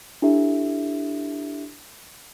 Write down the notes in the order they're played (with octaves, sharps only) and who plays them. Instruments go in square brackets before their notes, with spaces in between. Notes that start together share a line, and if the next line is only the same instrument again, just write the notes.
[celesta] D4 E4 G4 A4 E5